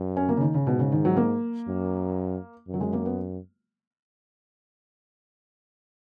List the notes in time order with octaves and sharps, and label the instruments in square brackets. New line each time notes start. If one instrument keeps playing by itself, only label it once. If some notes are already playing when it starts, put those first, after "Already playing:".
Already playing: [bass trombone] F#2
[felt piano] C#4
A#3
C#3
D#3
C#3
[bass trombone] G#2 [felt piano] B2
[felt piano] C#3
D#3
F#3
A#3
[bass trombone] F#2
F#2
[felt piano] F#3
G#3
A#3
B3